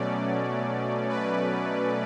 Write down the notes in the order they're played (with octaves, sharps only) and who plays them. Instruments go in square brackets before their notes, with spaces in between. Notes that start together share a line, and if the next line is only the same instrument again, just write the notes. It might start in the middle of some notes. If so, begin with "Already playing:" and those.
Already playing: [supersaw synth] B2 F#3 A3 C#4 D5
B4